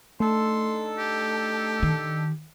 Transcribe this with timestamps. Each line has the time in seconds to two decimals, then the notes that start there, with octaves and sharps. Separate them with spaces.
0.20 A3 D4 D#4 A4 C6
0.98 G4
1.83 D#3